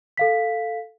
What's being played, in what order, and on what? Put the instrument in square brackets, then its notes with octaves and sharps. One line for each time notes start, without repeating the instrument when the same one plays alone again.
[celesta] A4 F5 B6